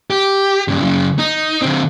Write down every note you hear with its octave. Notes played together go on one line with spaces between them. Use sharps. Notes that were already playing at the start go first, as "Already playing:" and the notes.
G4
G2 C#3
F#2 C#3
D#4
D3 C4